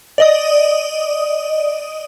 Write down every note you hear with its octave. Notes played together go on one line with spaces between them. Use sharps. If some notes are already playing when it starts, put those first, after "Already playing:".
D5 D#5 D#6